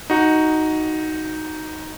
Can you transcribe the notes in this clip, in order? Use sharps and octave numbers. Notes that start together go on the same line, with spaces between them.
D#4 F#4